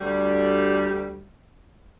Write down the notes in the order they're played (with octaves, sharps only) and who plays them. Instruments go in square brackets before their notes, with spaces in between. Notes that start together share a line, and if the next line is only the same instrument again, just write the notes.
[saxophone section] D2 G3